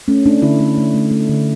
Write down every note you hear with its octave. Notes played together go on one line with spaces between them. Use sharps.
A3 C#4
A3 D4
D3 E4
A3
A3
A3
A3
D3